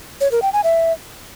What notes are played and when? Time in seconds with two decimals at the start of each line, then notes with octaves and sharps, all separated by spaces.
0.21 C#5
0.31 A#4
0.42 G5
0.53 G#5
0.64 E5